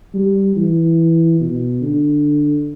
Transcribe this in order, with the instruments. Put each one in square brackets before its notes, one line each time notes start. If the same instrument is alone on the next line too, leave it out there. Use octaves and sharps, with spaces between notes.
[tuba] G3
E3
B2
D3